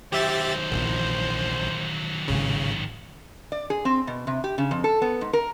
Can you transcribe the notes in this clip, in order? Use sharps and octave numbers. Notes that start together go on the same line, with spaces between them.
D#3 F#3 G4 C5 E5 A6
A#1 A#2 E3
A1 G#2 C#3
D5
G#4
C4
B2
C3
G4
C#3
F2
A4
B3
G#2
A#4